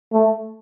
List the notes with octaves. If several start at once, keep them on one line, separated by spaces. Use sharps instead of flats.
A3